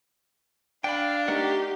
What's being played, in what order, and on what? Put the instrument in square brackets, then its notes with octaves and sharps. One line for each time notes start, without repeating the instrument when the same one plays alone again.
[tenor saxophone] D4 [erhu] F5 [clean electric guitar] G5 B5
[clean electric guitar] A3 A#4 F#5 [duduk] D#4 [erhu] G4